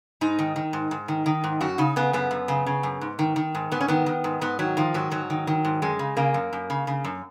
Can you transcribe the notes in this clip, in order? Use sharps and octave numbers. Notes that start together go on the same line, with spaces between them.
G#2 D#4
D#3
D#3
G#2
G#2
D#3
D#3
G#2
F#2 F#4
C#3 D#4
C#3 B3
F#2 B3
F#2
C#3
C#3
F#2
G#2
D#3
D#3
G#2
G#2 B3
C#4
D#3 B3
D#3
G#2
G#2 B3
D#3 F#3
D#3 F3
G#2 F#3
G#2 F#3
D#3
D#3
G#2
F#2 G#3
C#3
C#3 A#3
F#2
F#2
C#3
C#3
F#2